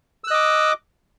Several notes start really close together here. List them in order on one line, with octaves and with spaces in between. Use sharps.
E6 F#6 D#5 D6